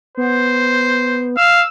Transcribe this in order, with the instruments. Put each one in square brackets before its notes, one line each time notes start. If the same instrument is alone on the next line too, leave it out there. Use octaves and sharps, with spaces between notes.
[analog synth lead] B3 [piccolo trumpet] C5
[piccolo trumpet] F5 [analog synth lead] E6